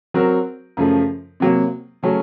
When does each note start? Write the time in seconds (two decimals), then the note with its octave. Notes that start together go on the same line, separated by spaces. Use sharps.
0.14 F#3 C4 F#4 A#4
0.77 F#2 C#3 F3 A3
1.40 C3 F#3 A#3
2.03 C#3 F#3 A3 C#4